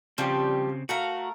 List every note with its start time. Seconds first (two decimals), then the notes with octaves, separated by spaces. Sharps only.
0.18 C#3 F3 G3 C4 G4
0.89 A3 F#4 A#4 F5